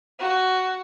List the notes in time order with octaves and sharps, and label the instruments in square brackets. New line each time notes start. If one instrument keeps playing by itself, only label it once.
[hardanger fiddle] F#4